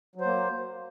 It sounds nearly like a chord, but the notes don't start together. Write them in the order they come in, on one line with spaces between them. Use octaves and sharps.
F#3 C5 A#3